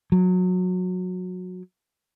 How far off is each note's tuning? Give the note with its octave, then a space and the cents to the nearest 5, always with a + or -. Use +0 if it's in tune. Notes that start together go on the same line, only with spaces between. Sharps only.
F#3 -20